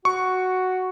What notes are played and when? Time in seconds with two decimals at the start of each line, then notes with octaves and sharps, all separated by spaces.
0.05 F#4 C#6